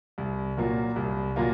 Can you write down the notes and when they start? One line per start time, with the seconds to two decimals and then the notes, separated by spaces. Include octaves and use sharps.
0.18 C2
0.57 A#2 F#3 A#3 F4
0.96 C2
1.36 A#2 F#3 A#3 F4